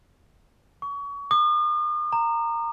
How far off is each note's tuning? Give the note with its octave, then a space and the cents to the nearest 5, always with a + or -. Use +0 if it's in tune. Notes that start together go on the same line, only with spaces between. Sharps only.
C#6 +30
D#6 -45
A#5 -15